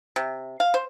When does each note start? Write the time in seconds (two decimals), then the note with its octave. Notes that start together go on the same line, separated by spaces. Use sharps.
0.16 C3
0.60 F5
0.74 C5